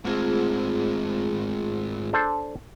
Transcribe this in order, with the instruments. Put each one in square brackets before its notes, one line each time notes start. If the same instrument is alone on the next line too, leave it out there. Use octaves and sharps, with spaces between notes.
[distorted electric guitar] G#2 C4 [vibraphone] A3 F4 G#4
[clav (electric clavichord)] D4 A4 C5